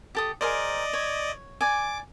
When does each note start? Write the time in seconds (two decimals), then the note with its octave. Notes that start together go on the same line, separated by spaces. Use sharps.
0.15 G4 A4 D#6
0.41 G#4 A#4 C5 D5 D#5
0.93 C#5
1.61 D5 G#5 D6